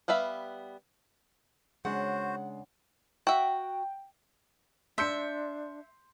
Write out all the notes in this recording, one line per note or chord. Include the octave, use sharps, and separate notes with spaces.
G3 B3 B4 E5 F5
C#3 G#3 D4 F#4 C5 F#5
F#4 E5 G5
D4 E5 C6 G6 C#7